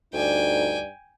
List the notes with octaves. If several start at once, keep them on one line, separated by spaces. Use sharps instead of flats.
D2 G2 D#4 D5 G5 G#5